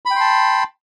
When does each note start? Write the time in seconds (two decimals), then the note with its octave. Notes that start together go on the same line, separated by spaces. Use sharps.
0.06 B5
0.10 G5
0.15 C6
0.20 A5